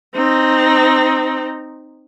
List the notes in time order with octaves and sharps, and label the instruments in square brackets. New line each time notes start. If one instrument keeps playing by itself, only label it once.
[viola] C4 D#4